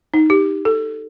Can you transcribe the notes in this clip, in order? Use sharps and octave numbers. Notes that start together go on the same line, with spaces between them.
D#4
G4
A4